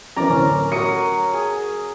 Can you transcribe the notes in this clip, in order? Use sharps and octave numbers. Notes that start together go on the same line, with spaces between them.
F#2 E3 C4 A#4 D5 A#5
D1 C#4
F#3 A#4 D#6 C#7
G#4